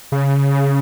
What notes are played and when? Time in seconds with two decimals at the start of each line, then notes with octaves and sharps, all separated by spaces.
0.12 C#3